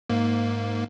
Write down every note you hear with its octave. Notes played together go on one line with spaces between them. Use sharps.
G#2 A#3